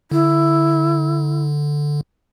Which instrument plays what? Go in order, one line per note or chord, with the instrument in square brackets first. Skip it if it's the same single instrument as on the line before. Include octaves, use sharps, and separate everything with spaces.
[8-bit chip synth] D3 [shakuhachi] E4